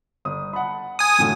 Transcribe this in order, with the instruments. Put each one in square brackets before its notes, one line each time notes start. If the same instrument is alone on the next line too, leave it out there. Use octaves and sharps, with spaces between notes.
[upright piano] G1 D#6
F#5 A5 B5
[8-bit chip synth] G#5 D#6
[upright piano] F#2 A2 D3